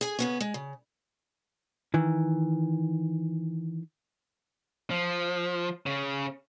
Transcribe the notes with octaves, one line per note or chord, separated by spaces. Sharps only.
G#4 G#5
C#3 B3 C#4
G#3
C#3
D#3 E3
F3
C#3